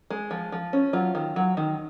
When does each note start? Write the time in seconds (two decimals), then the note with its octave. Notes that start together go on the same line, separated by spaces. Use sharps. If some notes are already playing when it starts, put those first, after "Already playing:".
0.10 G#3
0.31 F3
0.52 F3
0.73 C#4
0.93 F#3 F4
1.15 D#3
1.36 F#3
1.57 D#3